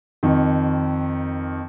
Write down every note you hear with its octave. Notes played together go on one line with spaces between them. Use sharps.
F2 D#3